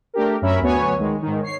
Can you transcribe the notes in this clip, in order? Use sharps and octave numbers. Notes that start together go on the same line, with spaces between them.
A3 D4 G4 A#4
F#2 C#4 A#4 E5 B5
D2 F#3 B3 C#5 G#5
D#3 G#3
G#2 D#3
C#5 C7